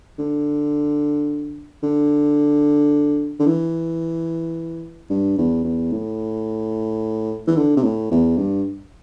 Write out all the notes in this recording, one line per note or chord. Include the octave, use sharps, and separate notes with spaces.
D3
D3
D3
E3
G2
E2
E2
A2
E3
D3
C3
A2
E2
G2